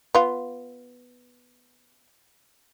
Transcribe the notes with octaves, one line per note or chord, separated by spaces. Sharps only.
B3 F4